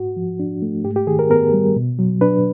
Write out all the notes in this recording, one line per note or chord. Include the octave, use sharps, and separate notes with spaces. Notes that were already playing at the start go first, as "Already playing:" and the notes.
Already playing: G#2 F#4
F3
D4
A3
G#2 G4
G4
D#3 G#4
A#4
B3 A#4
G3
B2
F#3
D4 B4